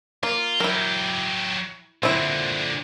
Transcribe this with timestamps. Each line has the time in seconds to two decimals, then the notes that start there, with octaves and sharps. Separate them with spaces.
0.23 A#3 F4
0.60 F#3 E4 G4 A#4
2.03 A#2 D3 C4 E4